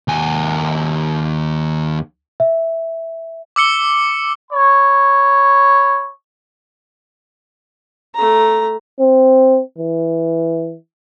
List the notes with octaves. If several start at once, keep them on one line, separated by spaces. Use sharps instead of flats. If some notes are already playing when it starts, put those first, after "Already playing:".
D#2 G#5
E5
D6 E6 C#7 G7
C#5 B5
A3 A#5
C4
E3